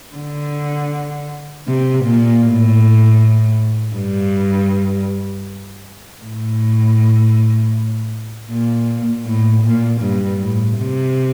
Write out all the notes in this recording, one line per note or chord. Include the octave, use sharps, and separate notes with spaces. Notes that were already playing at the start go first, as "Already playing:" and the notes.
D3
C3
A#2
A2
G2
A2
A#2
A2
A#2
G2
A2
C3